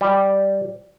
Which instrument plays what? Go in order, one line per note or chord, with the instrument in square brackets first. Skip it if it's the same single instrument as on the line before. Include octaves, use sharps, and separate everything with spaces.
[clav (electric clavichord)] G3